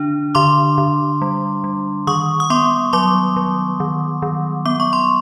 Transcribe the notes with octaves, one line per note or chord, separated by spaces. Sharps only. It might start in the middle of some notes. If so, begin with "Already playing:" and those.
Already playing: D3 D4
D3 C6 D6
D3
G3
G3
D#3 C#6 D#6
D#6
B3 C6 D6
F#3 C6 D6
F#3
D#3
D#3
B3 D6
C#6
C6